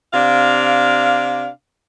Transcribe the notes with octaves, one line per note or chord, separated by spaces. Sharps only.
C3 D4 F5